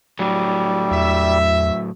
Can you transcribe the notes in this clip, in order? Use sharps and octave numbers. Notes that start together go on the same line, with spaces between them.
A2 F#3 G3
E2 E5